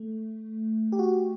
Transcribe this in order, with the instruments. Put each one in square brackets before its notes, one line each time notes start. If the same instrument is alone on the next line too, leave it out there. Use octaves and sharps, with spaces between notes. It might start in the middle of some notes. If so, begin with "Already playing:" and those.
Already playing: [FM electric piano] A3
G4
F#4